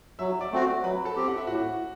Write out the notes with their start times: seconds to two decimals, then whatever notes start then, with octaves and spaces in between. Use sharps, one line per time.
0.19 F#3 E5 E6
0.41 D5 D6
0.51 A3 C4 F#4
0.84 F#3 B4 B5
1.05 A4 A5
1.16 C4 G4
1.28 F#5
1.37 E5
1.47 A2 F#4 F#5